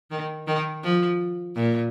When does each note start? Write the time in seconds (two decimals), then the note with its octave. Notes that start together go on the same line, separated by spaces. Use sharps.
0.11 D#3
0.47 D#3
0.83 F3
1.56 A#2